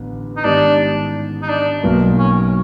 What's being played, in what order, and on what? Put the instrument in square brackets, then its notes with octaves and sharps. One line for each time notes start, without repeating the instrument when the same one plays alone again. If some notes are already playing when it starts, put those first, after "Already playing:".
Already playing: [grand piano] A1 D3 B3
[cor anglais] D#4
[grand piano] G#2 D#3 G3 B3 [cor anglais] D4
[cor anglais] D#4
D4
[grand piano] B1 B2 F#3 A#3
[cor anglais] C#4